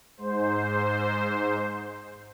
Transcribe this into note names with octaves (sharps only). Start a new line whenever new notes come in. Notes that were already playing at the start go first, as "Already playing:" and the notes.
G#2 C5